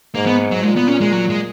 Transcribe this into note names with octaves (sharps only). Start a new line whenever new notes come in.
G#2 A#3
B3
F#3
A#2 G#3
B3
C#4
G#3
F#3
G#3